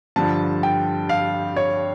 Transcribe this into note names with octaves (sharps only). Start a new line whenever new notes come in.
G2 D3 F3 A5
G5
F5
C#5